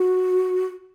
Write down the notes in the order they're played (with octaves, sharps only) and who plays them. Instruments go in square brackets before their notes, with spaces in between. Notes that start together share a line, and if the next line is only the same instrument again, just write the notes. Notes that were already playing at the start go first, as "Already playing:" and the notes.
Already playing: [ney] F#4